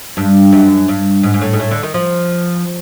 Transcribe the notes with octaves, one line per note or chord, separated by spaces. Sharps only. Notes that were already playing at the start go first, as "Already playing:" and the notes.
G2
F#2
G2
G#2
G#2
A2
G#2
A2
D3
D#3
F3